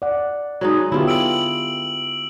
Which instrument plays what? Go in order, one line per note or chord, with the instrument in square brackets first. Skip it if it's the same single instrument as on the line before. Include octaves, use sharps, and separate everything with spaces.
[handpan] D5 F#5
[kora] F#3 G#3 D#4
[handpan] D3 B3 G4 [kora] E4 F4
[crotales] E6 D7 F#7